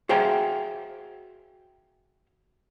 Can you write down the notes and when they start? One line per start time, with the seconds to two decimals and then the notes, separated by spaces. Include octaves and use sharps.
0.09 F#4 G#4 C5 E5 F5 G5